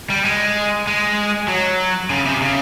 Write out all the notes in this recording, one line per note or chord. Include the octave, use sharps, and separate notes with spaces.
G3
G#3
G#3
F#3
C#3
C3
C#3